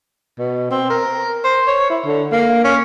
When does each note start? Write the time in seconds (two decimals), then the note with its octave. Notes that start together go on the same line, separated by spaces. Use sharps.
0.38 B2
0.71 C4
0.90 A#4
1.44 C5
1.67 C#5
1.90 E4
2.05 D3
2.32 A#3
2.64 C#4